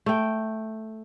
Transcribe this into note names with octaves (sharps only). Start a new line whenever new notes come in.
A3 G5